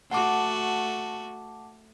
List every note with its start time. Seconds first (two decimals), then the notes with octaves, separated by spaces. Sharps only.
0.11 A3 F#4 F#5 A5 D6